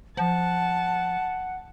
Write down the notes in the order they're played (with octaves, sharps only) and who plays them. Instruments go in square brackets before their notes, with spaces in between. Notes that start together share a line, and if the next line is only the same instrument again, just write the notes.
[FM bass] F3 [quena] F#5 [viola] A5